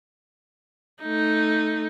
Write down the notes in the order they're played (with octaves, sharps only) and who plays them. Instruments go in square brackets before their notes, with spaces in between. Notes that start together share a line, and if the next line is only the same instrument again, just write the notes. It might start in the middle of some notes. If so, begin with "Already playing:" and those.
[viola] A3 D#4